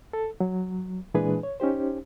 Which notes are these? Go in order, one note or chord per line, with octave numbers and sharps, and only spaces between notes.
A4
F#3
A#2 E3 G#3 D4 G#4 B4
C#5
C#4 D#4 G4 C5